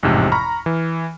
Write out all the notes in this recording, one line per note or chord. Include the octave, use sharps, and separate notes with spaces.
A1 F2 G#2 C3
A#5 B5 C#6 F6
E3